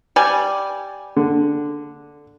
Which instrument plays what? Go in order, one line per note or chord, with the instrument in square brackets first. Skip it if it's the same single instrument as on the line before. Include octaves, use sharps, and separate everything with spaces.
[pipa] G3 G#5
[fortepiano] D3